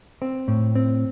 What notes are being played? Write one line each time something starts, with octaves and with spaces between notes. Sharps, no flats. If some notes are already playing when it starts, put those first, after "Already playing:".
C4
A2
C4